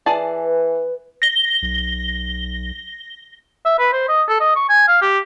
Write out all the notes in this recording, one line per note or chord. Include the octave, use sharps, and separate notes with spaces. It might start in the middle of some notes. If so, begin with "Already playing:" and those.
E3 G#4 D5 A5
B4
A#6 G7
B1
E5
B4
C5
D#5
A4
D#5
C#6
G#5
F5
G4